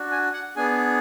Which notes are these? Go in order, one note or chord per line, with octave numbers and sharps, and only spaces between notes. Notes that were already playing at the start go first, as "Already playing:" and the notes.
Already playing: D4 F#4
G#5
F#5
B3 D4 G#4 G#5